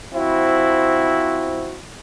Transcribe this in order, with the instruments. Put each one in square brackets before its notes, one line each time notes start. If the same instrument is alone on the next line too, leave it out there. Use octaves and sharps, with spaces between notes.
[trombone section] F3 C4 E4 F#4